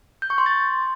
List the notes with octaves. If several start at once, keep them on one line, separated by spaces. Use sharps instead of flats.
G6
C#6
C6
A6